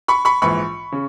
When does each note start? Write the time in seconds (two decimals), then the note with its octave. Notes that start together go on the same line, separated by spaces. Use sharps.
0.08 B5 C#6
0.25 B5 C#6
0.42 A#1 G#2 E3 B5 C#6
0.92 C#3